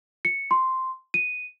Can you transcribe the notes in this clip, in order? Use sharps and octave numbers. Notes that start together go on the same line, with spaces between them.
C#7
C6
D#7